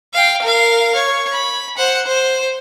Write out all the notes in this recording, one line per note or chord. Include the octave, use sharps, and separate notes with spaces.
F5 G5
A#4 F5
C#5
B5
C5 F#5
C5